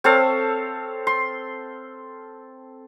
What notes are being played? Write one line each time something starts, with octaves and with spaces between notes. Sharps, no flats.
C4 A4 C#5 F5
C6